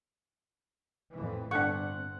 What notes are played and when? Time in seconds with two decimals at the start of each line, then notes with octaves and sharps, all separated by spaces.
1.13 F2 A2 E3
1.51 G1 C4 D4 A4 F#5 C#6